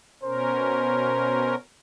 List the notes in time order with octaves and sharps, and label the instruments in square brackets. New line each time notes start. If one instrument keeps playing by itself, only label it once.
[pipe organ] B2 C#4 A#4 [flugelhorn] C5